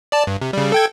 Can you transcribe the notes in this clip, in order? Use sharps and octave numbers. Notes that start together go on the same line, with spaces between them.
D5 A5
G2
C3
C#3 G3
A4 G5 G#6